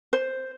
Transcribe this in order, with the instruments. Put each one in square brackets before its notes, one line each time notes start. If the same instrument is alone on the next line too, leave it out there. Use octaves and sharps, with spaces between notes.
[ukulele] C5